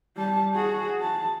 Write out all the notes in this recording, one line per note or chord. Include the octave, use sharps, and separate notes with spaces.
G3 A5
F#4 G#4
A5